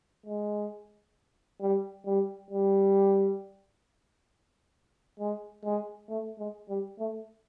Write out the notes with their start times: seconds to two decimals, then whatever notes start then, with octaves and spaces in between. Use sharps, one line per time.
0.26 G#3
1.61 G3
2.06 G3
2.50 G3
5.20 G#3
5.64 G#3
6.09 A3
6.39 G#3
6.69 G3
6.99 A3